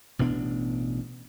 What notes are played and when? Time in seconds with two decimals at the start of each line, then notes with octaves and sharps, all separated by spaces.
0.19 A1 B2 B3 D4